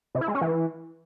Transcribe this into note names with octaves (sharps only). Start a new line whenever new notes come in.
C3
E4
G#3
C#4
E3